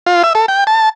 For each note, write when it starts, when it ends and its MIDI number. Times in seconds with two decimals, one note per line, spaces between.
0.06 0.23 65
0.24 0.33 76
0.35 0.46 69
0.48 0.64 79
0.67 0.89 81